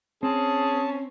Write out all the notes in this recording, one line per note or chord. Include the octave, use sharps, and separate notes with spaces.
C4 C#4 G#4 A5